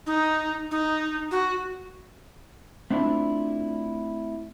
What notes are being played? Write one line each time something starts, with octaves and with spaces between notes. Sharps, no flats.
D#4
D#4
F#4
A3 C4 D4 E4 F4